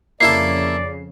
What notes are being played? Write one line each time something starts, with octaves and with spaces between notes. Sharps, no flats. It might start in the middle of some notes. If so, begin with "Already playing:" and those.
F2 C#3 A#3 E4 A4 D5 C7